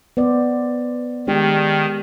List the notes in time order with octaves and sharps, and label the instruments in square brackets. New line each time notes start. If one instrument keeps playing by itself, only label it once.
[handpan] B3 C5 D5
[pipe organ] D#3 [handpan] G#3 D4 G4